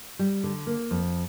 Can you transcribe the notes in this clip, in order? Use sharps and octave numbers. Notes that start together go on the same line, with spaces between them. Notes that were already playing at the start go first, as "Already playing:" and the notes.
G3
D3
A#3
F2